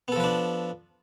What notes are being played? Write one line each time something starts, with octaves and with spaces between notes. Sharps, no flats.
F3 B3 D4 A4 B4